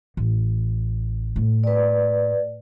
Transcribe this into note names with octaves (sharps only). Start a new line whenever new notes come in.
A1
A2
B4 D5